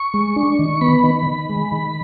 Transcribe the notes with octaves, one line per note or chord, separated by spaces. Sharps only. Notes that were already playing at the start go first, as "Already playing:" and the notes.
Already playing: C#6
G#3
D4
D#3
B3 B5
D#3
D#3
G#3
D#3